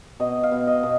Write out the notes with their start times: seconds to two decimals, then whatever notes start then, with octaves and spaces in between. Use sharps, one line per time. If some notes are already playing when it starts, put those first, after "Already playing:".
0.20 B2 D#5
0.43 F5
0.51 B2
0.67 D#5
0.83 B2